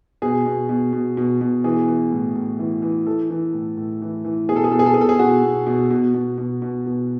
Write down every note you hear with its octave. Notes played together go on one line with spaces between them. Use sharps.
B2 G#4
B2
B2
B2
B2
B2
E3 G#4
E3
A2
A2
E3
E3
E3 A4
E3
A2
A2
E3
E3
B2 G#4
A4
G#4
B2 A4
G#4
A4
B2 G#4
A4
G#4
B2 F#4
B2
B2
B2
B2
B2
B2
B2